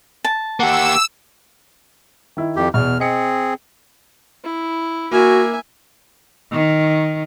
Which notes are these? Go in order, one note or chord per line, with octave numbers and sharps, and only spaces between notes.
A5
A#3 G4 F#5 E6
D#3 E4
F2 G4
E2 B2 F6
C4 G#4 D#5 C#7
E4
A#3 F#4 A#4 E5 G#5
D#3